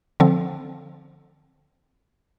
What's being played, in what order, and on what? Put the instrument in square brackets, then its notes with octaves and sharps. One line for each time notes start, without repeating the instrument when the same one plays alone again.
[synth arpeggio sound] D3 F3 C4